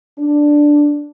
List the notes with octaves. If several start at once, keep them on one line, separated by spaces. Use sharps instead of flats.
D4